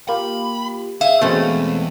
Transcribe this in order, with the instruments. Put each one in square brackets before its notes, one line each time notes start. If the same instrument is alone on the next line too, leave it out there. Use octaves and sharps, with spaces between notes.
[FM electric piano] A#3 F4 G4 [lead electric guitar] B5
[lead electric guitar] G#4 [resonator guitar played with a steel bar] E5 [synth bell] F5
[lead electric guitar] E2 [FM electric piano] B2 G#3 C4 [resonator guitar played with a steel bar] A3 C#4